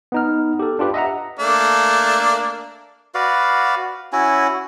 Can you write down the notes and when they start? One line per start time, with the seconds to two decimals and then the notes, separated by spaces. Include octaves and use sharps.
0.12 B3 D#4 F6
0.59 G4 A4
0.79 D4 F4 G4 B4
0.94 D#5 E5 F#5 A#5
1.39 A3 A#3 D4
3.15 F#4 B4 D5 F5
4.13 C#4 E4 F#4 G#5